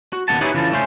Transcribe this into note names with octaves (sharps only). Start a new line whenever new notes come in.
F#4
D#2 B2 A#3 F#5 A5
D#4 E4 G4 G#4 B4 C#5
C#3 E3 F4 A4
A3 C#4 C5